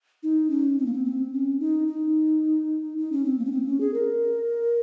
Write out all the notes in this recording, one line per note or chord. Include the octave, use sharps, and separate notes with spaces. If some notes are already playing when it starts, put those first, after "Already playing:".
D#4
C#4
C4
A#3
C4
C4
C#4
D#4
D#4
D#4
C#4
C4
A#3
C#4
C4
C#4
G#4
A#4